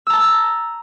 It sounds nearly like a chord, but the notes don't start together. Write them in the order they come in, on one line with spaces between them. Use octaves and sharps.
E6 A#5 A5